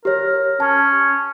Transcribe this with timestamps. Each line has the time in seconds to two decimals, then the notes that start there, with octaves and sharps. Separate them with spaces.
0.05 G4 A#4 C#5
0.60 C#4 A5